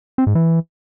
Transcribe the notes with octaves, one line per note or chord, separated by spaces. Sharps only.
C4
G#2
E3